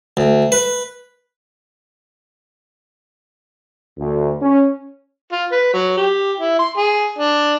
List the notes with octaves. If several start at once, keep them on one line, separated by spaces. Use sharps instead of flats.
D2
B4
D2
C#4
F4
B4
F#3
G4
E4
C6
G#4
D4